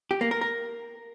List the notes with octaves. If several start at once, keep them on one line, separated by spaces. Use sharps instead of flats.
G4
A#3
A#4
A#4